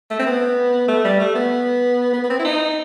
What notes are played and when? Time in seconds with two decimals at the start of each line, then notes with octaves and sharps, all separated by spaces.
0.10 A3
0.19 C4
0.26 B3
0.88 A3
1.04 G3
1.20 A3
1.35 B3
2.13 B3
2.24 B3
2.30 C4
2.39 E4
2.45 D#4